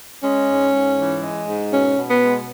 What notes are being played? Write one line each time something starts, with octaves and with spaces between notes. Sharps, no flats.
G#3 C#4
G#2
G#2
E3
G#3
G#2
B2 C#4
B2
B3
G#3